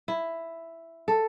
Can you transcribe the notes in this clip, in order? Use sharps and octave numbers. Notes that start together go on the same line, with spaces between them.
E4
A4